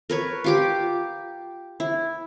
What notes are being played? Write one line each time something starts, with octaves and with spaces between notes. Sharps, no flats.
A#4 B4 C#5
F4 G4 D6
E4